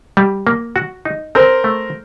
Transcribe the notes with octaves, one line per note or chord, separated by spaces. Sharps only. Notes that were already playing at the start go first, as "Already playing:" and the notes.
G3
A#3
F#4
D#4
C4 A#4 C5
A3